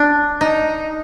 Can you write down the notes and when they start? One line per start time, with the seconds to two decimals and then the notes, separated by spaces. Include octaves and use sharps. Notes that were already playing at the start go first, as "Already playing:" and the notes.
Already playing: D4
0.41 D#4